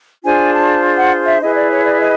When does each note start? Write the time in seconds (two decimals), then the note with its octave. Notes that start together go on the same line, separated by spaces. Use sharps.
0.24 D4 F4 G#4 C5 G#5
0.53 A5
0.97 F#5
1.25 E5
1.41 E4 G#4 B4 D#5
1.55 D5
1.70 C#5
1.84 D5
1.99 D#5